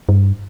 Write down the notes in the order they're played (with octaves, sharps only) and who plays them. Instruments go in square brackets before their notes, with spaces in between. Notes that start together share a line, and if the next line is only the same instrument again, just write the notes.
[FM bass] G2